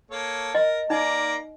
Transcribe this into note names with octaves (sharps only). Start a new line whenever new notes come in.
A#3 A4 C#5
A#4 D#5
A#3 D#4 D5 A#5